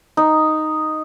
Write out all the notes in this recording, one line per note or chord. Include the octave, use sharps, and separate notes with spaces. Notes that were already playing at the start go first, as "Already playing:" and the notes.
D#4